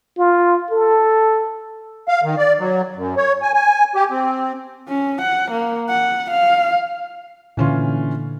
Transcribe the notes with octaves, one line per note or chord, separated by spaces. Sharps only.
F4
A4
F5
D#3
D5
F#3
F#2
C#5
G#5
G#5
G4
C4
C#4
F#5
A#3
F#5
F5
A#2 D3 E3 C#4 F4